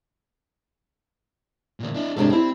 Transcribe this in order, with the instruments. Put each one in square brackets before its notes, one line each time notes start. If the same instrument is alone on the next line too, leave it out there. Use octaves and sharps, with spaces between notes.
[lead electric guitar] D2 A#2
D4 E4
[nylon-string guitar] G#2 C3 D4 [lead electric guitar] A4 C#5
[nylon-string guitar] G3 E4 [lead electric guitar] C4